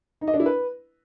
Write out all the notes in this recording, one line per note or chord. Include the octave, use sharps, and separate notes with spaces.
D#4
D#5
D4
E4
B4